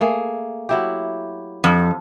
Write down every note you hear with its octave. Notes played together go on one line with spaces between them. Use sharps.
A3 A#3 G#4
F#3 E4 G4
F2